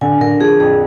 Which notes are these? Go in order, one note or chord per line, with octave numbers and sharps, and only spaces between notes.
D3 G#5
D3 A#4
F3 G#4
F2 G#4